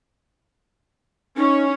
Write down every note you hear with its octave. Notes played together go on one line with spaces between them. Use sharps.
C#4 D#4